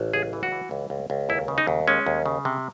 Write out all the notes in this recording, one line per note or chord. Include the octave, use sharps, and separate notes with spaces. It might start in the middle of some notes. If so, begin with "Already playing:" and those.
Already playing: A1
C#2 G#4
E3
F#4
E3
C#2
C#2
C#2
D#2 E4
C#3
D#4
D#2
G#3 C#4
D#2
C#3
C3